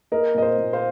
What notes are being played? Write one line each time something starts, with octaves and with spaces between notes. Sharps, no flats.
A#3 A#4 D#5
A#2 D#5
C5
A#2
C5 F5